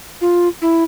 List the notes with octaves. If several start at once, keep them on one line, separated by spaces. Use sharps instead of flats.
F4
E4